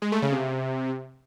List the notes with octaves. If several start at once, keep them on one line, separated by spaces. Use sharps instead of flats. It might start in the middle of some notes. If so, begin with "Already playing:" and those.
G#3
A3
C#3
C3